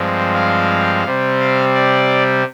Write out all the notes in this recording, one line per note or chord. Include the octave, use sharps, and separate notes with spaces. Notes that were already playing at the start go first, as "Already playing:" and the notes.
Already playing: G2 F3 G#3 C4
F5
C3 G3 C4
F5
D5